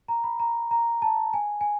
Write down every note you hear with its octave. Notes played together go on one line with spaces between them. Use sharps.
A#5
B5
A#5
A#5
A5
G#5
G#5